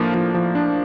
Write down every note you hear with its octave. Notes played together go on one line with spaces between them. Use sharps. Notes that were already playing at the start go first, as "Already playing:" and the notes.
Already playing: A2 F3 A#3 D4
F3
F3
D4